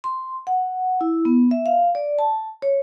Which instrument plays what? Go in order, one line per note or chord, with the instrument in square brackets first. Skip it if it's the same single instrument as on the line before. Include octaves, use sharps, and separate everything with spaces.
[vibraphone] C6
F#5
E4
B3
E5
F5
D5
A5
C#5